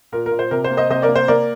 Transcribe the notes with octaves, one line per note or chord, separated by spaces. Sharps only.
A#2 A#4
A#4
A#2
C5
C3 A#4
C5
A#3
C5 D#5
C3 C5 D#5
A#4 D5
A#3
C5
A#3 A#4 D5